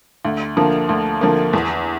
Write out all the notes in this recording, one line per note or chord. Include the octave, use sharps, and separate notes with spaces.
D2
D3 F3 A#3
D2
D3 F3 A#3
E2